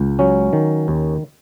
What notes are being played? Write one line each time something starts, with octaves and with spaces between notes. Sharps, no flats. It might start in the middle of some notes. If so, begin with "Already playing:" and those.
Already playing: C#2
F#3 C#4
D#3
D#2